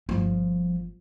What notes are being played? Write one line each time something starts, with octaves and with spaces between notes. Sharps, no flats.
G1 F3